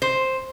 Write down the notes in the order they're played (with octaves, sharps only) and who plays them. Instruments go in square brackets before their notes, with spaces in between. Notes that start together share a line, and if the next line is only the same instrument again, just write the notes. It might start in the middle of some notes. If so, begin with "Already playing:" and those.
[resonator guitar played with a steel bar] C5